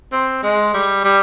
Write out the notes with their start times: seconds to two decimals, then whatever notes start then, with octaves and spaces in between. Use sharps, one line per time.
0.12 C4
0.43 G#3
0.74 G3
1.04 G3